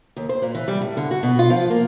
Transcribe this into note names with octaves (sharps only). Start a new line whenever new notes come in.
D#2
C5
A#2
E3
G3
A2
D3
F#4
B2
F4
F3
A#3